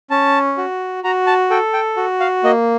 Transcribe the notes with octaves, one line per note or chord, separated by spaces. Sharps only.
C#4 A5
F#4
F#4 A#5
A5
A4 G5
G5
F#4
F5
A#3 D#5